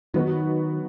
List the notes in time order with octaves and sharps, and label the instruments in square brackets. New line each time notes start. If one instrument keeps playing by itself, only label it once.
[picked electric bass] D#3 [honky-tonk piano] F#3 B3 D#4 F#4